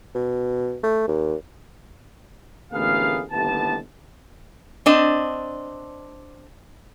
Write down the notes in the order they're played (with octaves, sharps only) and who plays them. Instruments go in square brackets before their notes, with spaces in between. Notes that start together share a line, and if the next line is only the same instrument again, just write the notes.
[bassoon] B2
A3
D#2
[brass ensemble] A1 D2 A#3 B3 G#4 F5
G1 D#2 A2 C3 B3 A5
[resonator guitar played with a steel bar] C4 D4 D#5